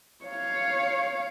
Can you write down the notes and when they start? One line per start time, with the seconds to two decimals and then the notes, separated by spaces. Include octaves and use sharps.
0.25 C#5 F5